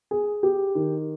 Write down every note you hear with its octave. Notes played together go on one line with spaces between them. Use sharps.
G#4
G4
D#3